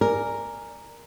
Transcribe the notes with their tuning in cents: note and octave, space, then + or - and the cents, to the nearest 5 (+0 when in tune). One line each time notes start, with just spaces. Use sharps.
A#4 +0 D5 +0 G#5 +0